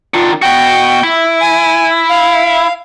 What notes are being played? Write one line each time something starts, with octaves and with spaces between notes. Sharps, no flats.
D#3 D4 F4
B2 F#4 G5
E4
G#5
F5